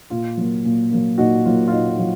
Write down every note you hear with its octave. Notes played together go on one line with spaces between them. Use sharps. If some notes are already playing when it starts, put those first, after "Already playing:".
A#2 F4
F#3 A#3
A#2
F#3 A#3
A#2 D#4 F#4
F#3 A#3 F4
F4
A#2 D#4
D#4
F#3 F4